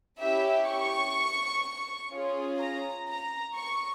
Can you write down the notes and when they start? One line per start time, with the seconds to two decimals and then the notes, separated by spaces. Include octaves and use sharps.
0.19 C#4 E4 G4 E5
0.67 C#6
2.12 C#4 F4 G#4
2.59 A#5
3.08 A#5
3.55 C#6